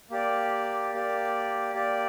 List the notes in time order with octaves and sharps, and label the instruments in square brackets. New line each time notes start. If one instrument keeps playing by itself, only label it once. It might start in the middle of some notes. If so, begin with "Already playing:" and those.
[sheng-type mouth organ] A#3 G4 D5
A#3 G4 D5
A#3 G4 D5